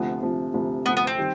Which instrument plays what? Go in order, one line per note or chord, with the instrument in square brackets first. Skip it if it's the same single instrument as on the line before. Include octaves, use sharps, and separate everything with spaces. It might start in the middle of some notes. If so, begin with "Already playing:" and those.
Already playing: [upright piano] D2 C3 F3 [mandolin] B3
[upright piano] D2 C3 F3
D2 C3 F3
[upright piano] D2 C3 F3 [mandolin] B3
[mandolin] B3
C4
[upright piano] D#3 G3